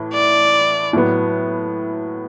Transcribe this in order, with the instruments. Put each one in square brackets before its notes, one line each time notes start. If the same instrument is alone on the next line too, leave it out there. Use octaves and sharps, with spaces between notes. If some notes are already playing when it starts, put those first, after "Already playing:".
Already playing: [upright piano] A2 E3
[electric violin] D5
[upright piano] A2 F#3 B3